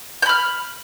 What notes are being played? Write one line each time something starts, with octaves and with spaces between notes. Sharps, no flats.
B5 F6 G6